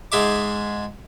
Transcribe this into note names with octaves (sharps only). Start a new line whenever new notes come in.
G#2 G#3 E5 D6